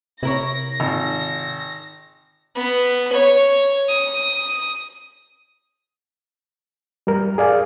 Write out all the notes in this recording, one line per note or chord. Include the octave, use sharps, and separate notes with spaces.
C3 E4 A#4 C#5 A#6
G#1 F4
B3
C#5
D#6
G3 A#4
G#4 D5 F5